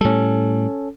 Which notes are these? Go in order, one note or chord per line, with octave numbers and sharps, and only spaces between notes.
A2 G3 C#4 A4